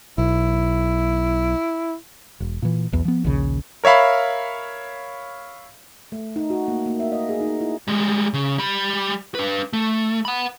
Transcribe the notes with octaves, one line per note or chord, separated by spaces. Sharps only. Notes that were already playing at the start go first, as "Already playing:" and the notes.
B1 E4
E1
A#2 E3
B1 E2
F3 B3
A#1 D#2 C#3
A#4 C#5 E5 F5 B5
A3
D#4
F#4
A#3
A#3
E5
D#5
G#4
D#4
E4
G3 G#3
C#3
G3 B5
D4 B4
A3
F#5 B5